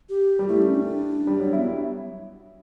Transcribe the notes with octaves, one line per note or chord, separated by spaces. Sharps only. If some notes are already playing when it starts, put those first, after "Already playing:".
G4
G3
A3 E4
C#4
D4
G3
F#3
B3 E4